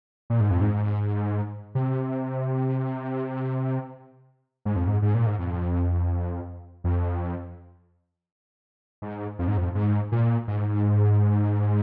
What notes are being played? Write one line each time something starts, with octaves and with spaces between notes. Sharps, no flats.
A#2
G#2
F2
G#2
C3
G#2
F2
G#2
G#2
A#2
G#2
F2
F2
G#2
F2
G#2
F2
G#2
A#2
G#2